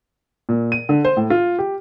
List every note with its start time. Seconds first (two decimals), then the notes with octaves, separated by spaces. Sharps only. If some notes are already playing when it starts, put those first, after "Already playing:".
0.49 A#2
0.72 D#7
0.89 D3
1.05 C5
1.17 A2
1.30 F4
1.58 G4